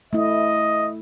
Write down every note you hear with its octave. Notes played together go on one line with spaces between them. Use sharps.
A3 E4 D#5